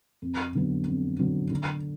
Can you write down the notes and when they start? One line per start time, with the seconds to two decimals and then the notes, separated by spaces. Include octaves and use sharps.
0.22 F2
0.55 D3 F#3 B3
0.87 F2
1.19 D3 F#3 B3
1.51 D3